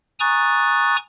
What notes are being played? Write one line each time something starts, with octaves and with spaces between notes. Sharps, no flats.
G#5 A#5 C#6 D#6 F#6 A6